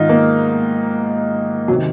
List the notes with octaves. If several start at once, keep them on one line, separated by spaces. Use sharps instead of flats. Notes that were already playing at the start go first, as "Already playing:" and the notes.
Already playing: G#2 D#3 D#4 F4
A#3
F#3
C3 D#3